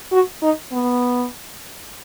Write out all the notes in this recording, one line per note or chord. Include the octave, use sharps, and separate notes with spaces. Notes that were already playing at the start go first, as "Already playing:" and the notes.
F#4
D#4
B3